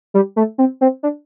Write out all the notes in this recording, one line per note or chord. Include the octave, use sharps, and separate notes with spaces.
G3
A3
C4
C4
D4